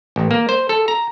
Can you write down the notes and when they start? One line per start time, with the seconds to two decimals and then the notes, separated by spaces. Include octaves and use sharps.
0.16 A1
0.31 A#3
0.49 C5
0.69 A4
0.88 A#5